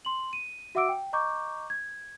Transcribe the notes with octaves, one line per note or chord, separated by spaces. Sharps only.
C6 F#7
D#7
F#4 E5 F#5 D6 E6 D7
G5
D#5 A#5 C#6 D6 G6
G#6